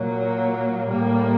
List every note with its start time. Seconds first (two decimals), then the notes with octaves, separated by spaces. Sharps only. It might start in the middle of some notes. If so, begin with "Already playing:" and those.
Already playing: A#2 F#3 A#3
0.86 A2 G3 A#3